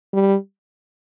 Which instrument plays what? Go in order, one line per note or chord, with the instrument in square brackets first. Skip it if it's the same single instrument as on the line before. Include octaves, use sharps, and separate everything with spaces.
[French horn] G3